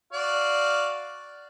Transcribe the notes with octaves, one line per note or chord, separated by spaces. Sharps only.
F#4 D5 F5